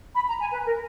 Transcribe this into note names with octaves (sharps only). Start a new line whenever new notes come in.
B5
A#5
G#5
B4
A#4